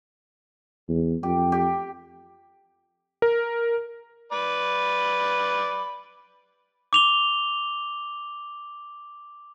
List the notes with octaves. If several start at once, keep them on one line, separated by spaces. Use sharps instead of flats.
E2
F2 G4
G4
A#4
B4 D5 B5
D6 F7 G7